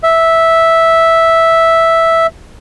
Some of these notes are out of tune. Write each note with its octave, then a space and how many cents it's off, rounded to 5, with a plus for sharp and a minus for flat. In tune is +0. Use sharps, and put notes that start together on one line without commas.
E5 -5